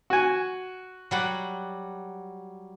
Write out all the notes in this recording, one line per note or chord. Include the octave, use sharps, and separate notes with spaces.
F#4 G#5
F#3 G3 F#5